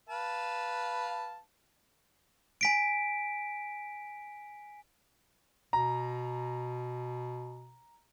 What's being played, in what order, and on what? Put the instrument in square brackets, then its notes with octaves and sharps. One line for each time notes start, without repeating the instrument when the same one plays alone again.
[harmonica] B4 F5 A5
[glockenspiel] G#5 B6 D7
[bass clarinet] B2 [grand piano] A#5